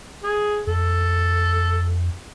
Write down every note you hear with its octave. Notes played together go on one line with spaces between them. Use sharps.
G#4
F2 A4